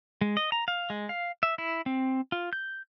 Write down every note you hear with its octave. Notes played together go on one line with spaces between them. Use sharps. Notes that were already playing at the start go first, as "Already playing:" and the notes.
G#3
D#5
A#5
F5
G#3
F5
E5
E4
C4
F4
G6